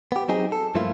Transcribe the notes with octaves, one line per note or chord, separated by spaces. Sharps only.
B3 G4
F#3 C4 D#4 G#4
A4
G2 F3 A3 A#3 E4 F4